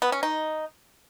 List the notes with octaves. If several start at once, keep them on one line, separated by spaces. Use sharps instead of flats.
B3
C#4
D#4